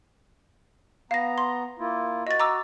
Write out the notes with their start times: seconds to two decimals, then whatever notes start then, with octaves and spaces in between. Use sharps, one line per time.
1.11 B3 F5 A#5 A#6
1.38 C6
1.79 A#3 E4 F4
2.27 F#4 D#5 A6
2.40 A#5 D6 E6